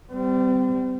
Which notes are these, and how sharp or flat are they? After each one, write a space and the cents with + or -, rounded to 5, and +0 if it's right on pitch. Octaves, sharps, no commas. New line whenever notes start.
G3 +0 C4 -35